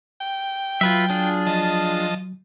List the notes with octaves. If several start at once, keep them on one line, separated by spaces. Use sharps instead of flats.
G5
F#3 F4 B4 E5
D4 F4 G#4
F3 D#5 A5